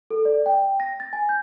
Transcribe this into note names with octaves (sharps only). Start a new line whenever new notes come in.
A4
D5
G5
A#6
A6
G#5
G6